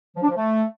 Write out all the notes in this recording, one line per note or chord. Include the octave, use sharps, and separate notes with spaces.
F3
D4
F3
A3